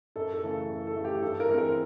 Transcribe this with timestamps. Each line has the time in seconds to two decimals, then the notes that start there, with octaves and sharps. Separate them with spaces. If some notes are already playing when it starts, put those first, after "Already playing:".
0.16 F#2 A4
0.33 A4
0.42 C#3 E3 A3
0.51 A4
0.69 F#2
0.87 A4
0.95 C#3 E3 A3
1.04 G4
1.22 G2 A4
1.40 A#4
1.49 E3 G#3 C4
1.58 A#4